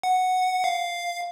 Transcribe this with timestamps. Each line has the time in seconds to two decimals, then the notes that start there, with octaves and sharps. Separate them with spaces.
0.03 F#5
0.64 F5